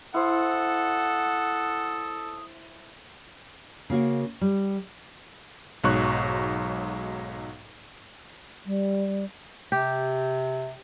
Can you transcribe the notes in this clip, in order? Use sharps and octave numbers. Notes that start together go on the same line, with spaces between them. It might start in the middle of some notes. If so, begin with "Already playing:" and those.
E4 A4 C5 F#5 D#6
C#3 A#3 F#4
G3
B1 G#2 F#3 C#6 F#6
G3
C3 G4